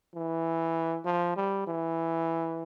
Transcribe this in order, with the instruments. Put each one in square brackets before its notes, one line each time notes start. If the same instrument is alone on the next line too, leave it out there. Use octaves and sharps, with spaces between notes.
[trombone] E3
F3
G3
E3